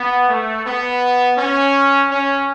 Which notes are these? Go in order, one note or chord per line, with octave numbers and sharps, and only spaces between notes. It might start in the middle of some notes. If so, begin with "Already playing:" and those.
Already playing: B3
A3
B3
C#4
C#4